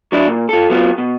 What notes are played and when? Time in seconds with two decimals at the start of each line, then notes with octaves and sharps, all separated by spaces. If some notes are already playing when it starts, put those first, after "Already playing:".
0.12 F#3 D4 E4
0.27 A#2
0.49 F4 A4
0.70 F#3 B3 F4
0.98 B2